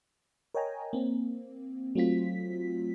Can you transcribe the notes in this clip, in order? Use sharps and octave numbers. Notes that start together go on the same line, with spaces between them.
A#4 C#5 D#5 G5 G#5 A#5
A#3 C4
F#3 A3 C4 F4 B6